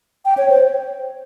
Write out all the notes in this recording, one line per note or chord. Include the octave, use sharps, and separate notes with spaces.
G5
C#5
C5